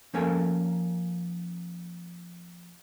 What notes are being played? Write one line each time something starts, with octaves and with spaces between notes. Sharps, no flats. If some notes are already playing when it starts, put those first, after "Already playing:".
F3 A#3 C#4 A4 A#4 G#5